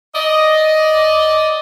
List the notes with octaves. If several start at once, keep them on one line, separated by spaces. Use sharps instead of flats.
D5 D#5